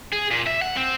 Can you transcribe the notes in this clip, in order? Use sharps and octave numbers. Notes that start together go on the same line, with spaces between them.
G#4
A#2
E5
F#5
C4